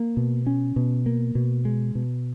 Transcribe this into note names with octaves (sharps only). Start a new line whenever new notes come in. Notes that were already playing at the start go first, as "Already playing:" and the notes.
Already playing: A#3
B2
C#4
B2
A#3
B2
G#3
B2